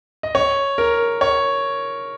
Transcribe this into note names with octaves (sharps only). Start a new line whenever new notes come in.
D#5
C#5
A#4
C#5